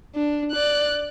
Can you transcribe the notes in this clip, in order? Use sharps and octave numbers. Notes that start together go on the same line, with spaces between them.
D4
D5 F#6